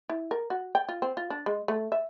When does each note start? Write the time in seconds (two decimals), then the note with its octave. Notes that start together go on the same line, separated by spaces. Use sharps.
0.10 E4
0.31 A#4
0.50 F#4
0.75 G5
0.89 F4
1.02 C4
1.17 F4
1.30 D4
1.46 G#3
1.68 A3
1.92 E5